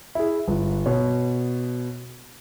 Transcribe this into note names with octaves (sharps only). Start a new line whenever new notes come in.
E4 G#4
G1
B2 C#5